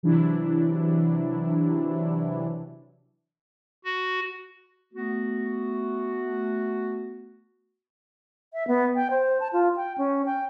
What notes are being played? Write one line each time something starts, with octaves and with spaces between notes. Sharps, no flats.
C3 E3 F#3 D4 E4
F#4
A3 B3 F#4
E5
B3
G5
C5
A5
F4
G5
C#4
G5